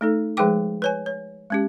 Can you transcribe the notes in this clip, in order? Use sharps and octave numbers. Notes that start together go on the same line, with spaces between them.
A3 D#4 A4
F3 G#3 G#4 B4 G5 D6
B4 C#5 G#5
C#5
G#3 C#4 G4